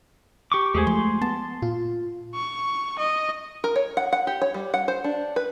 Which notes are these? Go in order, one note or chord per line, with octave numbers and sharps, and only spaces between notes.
G4 C#6 D6
E2 G#3 A3 G4 G#4 C5 G#5
F3 C6
B3 A5
A#2 F4
C#6
D#5
A#4
C#5
F#5
F#5
G4
C#5
G3
F#5
C5
D4
B4